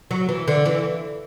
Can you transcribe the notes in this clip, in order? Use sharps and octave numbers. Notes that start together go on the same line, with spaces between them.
F#3
E3
D3
E3